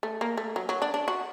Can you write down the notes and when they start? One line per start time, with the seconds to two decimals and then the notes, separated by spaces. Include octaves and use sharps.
0.03 A3
0.21 A#3
0.37 A3
0.56 F#3
0.69 F#3
0.82 D4
0.94 D4
1.08 F#4